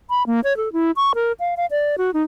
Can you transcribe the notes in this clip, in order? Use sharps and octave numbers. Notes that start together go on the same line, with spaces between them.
B5
A#3
C#5
A4
E4
C#6
A#4
F5
F5
D5
F#4
D#4